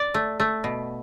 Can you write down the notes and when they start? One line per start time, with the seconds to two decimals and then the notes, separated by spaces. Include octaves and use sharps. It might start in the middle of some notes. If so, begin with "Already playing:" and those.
Already playing: D5
0.14 A3
0.40 A3
0.64 B2